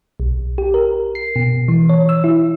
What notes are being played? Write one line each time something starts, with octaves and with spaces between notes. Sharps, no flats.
B1
G4
A#4
C7
B2
E3
C#5
E6
E4